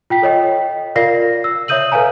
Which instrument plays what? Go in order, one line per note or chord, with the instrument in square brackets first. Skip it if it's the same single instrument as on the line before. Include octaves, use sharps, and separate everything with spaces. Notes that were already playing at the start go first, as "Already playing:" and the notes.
[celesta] F4 G5 B6
A4 C#5 D#5 G5
F4 A#4 D5 F5 A#6 C7
E6
C#5 E5 D#6 G6 D#7 F#7
A4 B4 C#5 F5 G#5 A#5